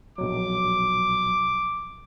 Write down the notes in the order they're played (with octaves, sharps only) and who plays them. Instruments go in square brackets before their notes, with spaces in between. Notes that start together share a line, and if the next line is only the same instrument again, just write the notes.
[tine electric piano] A#1 B2 F#3 [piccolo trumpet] D6